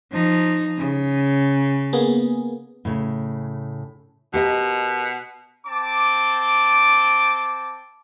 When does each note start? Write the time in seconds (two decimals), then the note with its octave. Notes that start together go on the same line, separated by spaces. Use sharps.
0.12 F3 D#4
0.78 C#3
1.93 A#3 B3 G#4
2.85 A2 C#3
4.34 B2 G4 A#4 D#5
5.66 C4 A5 D6